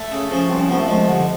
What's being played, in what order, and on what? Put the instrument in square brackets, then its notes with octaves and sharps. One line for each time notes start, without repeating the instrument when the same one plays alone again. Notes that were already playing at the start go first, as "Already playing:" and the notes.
Already playing: [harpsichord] A3
[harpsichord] C#3 [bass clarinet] C#4
[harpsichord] F3 [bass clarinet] C#4
[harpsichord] C2 [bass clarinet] C4
[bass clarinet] C#4
[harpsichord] F3 [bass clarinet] B3
[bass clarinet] A3
[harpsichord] F3 [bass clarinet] G#3
[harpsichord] C2 [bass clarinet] D3